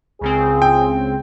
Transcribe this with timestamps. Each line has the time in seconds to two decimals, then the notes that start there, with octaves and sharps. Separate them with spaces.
0.21 C#2 C#3 C4 G#4
0.62 G5